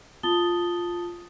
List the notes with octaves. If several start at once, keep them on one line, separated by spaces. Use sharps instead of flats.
F4 A5 D#6 A6 G7